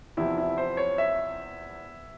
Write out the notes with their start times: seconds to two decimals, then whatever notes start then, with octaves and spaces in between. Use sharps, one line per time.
0.17 E2 C3 F3 E4
0.38 E4
0.58 C5
0.77 C#5
0.98 E5